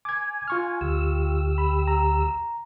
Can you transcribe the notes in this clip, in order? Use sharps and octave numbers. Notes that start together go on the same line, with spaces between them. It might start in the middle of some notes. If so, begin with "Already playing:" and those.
G#5 D6 G#6
F4 C#6 F6
D2 G4 E6
B5
A#5